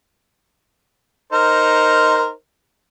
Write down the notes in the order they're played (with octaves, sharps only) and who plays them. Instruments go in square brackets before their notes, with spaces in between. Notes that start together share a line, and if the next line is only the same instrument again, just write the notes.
[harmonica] D#4 A#4 C5